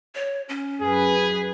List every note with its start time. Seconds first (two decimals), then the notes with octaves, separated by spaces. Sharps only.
0.15 C#5
0.49 C#4
0.82 F#2 G#4 B4